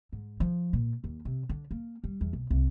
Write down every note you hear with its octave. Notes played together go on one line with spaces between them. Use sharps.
G#2
F3
A#2
D#2
C3
D3
A#3
G3
E2
B1
C2